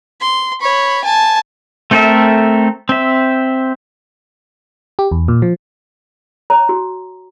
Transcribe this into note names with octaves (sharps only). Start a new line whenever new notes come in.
C6
C#5 B5
G#5 A5
A3 C4 A4 A#4 E5
C4 E5
G4
E2
A#2
F3
C#5 A#5
F#4